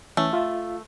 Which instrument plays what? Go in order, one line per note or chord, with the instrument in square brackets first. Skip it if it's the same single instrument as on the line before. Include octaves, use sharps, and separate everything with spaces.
[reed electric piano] E3 C#4 [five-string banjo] A3
[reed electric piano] F4 E5 F5